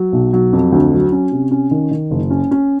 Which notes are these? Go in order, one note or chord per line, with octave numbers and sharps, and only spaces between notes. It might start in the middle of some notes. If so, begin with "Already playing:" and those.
Already playing: F#3
B1
F#3
F2
D2
F#3
C#4
C3
C#4
D#3
D#3
F#1
C#4
C#4